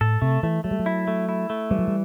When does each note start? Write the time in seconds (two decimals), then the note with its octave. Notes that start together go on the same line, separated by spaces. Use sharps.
0.01 A2 A4
0.22 C3 A3
0.43 E3 A3
0.64 F#3 A3
0.71 G3
0.80 F#3
0.86 E4
1.08 A3
1.29 E4
1.50 A3
1.71 E3 G3
1.79 F#3
1.88 G3